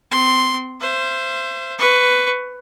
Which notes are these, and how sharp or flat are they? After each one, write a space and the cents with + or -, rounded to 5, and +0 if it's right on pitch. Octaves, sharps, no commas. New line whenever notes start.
C4 -30 C6 +0
C5 +0 E5 +40
B4 +10 C#6 +0